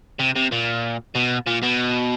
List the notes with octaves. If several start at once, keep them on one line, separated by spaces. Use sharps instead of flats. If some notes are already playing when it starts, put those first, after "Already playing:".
C3
C3
A#2
B2
A#2
B2